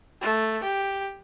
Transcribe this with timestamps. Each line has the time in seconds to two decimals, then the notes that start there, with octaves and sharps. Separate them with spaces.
0.21 A3
0.63 G4